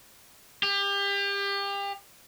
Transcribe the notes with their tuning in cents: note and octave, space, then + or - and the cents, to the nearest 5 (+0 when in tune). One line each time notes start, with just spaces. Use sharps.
G4 +30